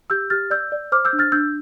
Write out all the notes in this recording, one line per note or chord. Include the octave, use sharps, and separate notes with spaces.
G4 E6 G6
G4 F6 A6
D5 E6 G6
D5
C5 D6 F6
E6 G6
D4
F6 A6
D4 E6 G6